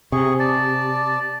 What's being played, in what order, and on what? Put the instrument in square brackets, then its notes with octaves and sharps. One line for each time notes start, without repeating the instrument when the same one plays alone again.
[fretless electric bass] C3 [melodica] G#4 C#6
[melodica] D5 A5